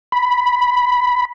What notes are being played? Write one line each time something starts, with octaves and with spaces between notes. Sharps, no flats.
B5